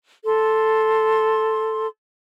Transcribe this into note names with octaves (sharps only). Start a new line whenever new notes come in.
A4 C6